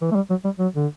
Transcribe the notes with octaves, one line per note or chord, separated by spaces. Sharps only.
E3
A3
G3
F#3
G3
F#3
D3